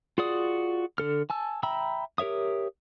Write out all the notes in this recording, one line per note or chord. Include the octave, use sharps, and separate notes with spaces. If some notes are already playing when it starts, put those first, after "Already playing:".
F4 F#4 G#4 D5 D#6
D3 A4 F6
G#5 A5 E6
E5 G5 A#5 B5 E6
G4 A#4 C#5 E5 D#6